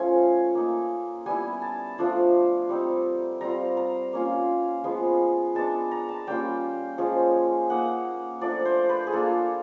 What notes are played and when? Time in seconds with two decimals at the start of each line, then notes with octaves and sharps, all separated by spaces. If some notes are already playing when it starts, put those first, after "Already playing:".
Already playing: F3 A3 C#4 F4 G#5
0.55 A#3 D#4
1.26 G3 B3 E4 G#5
1.62 A5
1.98 F3 A3 D4 F4
2.69 G3 C4 D#4
3.41 G3 C4 F4 A#5
3.77 A#5
4.13 A#3 C#4 F4
4.84 F3 G#3 B3
5.55 G#3 B3 D4 A5
5.91 A#5
6.09 A5
6.27 G3 A#3 C#4 F4 G5
6.98 F3 G#3 C#4
7.70 A#3 D#4 F#5
8.41 F3 A3 D4 D5
8.65 C5
8.89 B4
9.07 G#4
9.12 A#3 D4 F4 A4